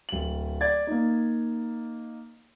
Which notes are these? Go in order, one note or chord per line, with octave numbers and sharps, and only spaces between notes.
D1 F#7
D5 G#6 A6
A#3 D#4